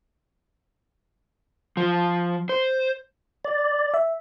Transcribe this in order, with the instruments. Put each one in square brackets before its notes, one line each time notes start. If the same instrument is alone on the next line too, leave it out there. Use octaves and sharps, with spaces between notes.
[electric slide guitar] F3
C5
[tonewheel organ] D5
[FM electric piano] E5